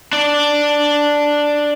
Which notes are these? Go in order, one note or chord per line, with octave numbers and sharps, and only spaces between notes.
D4 D5